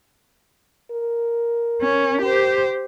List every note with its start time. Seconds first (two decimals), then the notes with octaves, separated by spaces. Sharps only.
0.91 A#4
1.82 C#4
2.22 G4 C5